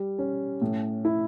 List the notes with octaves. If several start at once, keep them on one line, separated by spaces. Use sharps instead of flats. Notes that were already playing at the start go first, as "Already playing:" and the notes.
Already playing: G3
C#4
A2
E4